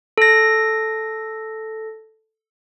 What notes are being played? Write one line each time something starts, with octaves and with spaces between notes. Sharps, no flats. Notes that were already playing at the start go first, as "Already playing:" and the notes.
A4 A#6